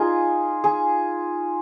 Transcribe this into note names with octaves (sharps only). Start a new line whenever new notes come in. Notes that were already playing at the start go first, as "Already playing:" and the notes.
Already playing: D#4 F4 G#4
G#4